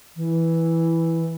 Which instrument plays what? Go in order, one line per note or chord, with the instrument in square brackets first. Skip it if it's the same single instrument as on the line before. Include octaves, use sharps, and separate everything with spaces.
[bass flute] E3